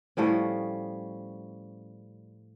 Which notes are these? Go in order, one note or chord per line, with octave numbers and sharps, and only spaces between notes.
A2 F3 G3 C#4